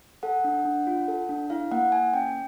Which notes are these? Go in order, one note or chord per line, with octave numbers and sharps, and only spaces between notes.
A4 F#5
D4
D4
F4
A4
D4
E4 F5
A#3 F#5
A#3 G#5
C#4 G5